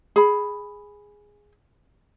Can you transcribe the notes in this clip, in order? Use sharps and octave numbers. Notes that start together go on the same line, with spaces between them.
G#4 B5